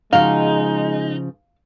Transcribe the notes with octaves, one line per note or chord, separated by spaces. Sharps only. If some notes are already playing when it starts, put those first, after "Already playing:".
C#3 F3 G#3 D#4 F#4 F5